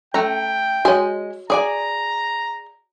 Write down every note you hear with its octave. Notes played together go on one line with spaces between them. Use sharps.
A3 C#4 G5 A#5
G#3 F#4 C#5 D#5 G#5
G#4 D5 G#5 A#5